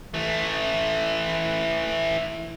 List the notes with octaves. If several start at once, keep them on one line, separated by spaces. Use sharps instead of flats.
E3 A3